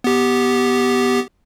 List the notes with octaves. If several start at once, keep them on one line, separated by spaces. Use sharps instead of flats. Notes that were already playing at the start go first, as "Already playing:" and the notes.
B3 G4